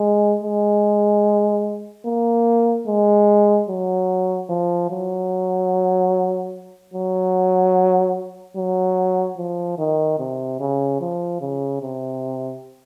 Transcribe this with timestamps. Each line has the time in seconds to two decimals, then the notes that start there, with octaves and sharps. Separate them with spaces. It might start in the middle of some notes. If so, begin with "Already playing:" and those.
Already playing: G#3
0.43 G#3
2.06 A#3
2.87 G#3
3.69 F#3
4.50 F3
4.91 F#3
6.94 F#3
8.56 F#3
9.37 F3
9.78 D#3
10.19 C3
10.60 C#3
11.00 F3
11.41 C#3
11.82 C3